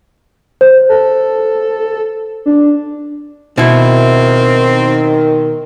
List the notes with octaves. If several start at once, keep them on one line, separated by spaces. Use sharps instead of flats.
C5
A4
D4
B2 D#3 C4 E4